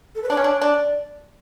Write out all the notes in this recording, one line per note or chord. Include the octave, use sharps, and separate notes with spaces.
A4
B4
D4 C#5
C#4
D4
D4 D5